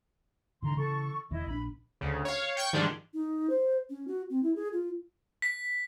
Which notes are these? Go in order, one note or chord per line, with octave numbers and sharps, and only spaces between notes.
G#2 D3 D#3 A#5 C6
C#3 E3 A4 C#6
E1 E2 D#3 E4 D#5
A#1 D4 B5
D2 C#3
C#5 F5
G5 C#6 G6
G#2 D#3 F3 G3 G#3 D4
D#4
C5
C#4
F#4
C4
E4
G#4
F4
B6